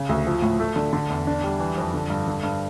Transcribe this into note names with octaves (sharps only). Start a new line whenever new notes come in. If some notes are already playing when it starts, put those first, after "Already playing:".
Already playing: C#3
D2
F3
A2
A3
D3
D3
E2
D4
G3
E3
F2
D3
G2
D3
G2